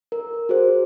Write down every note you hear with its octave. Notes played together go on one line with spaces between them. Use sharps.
A#4
F#4 G#4 C5